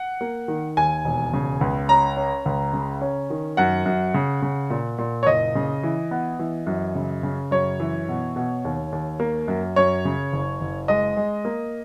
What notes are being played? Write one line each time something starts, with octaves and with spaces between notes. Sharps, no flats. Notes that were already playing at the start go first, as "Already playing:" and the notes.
Already playing: F#5
A#3
D#3
D#2 G#5
E1
C#3
C#2
C#4 A#5
C#4
C#2
C#3
C#4
D#3
F#2 F#5
F#2
C#3
C#3
A#2
A#2
C#5
F#1 D#5
C#3
E3
B3
E3
F#2
C#3
C#3
F#2 C#5
E3
B2
B2
D#2
D#2
A#3
F#2
F#2 C#5
C#3
F#1
F#1
G#3 D#5
G#3
A#3